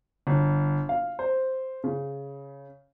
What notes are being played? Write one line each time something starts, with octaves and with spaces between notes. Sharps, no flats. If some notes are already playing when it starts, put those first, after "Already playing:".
G1
F5
C5
C#3